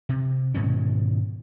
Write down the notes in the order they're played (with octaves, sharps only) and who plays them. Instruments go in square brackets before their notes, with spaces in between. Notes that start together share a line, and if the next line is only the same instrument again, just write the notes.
[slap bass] C3
G#2 B2 D#3 C#4